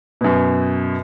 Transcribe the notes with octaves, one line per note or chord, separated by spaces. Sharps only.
F#2 B2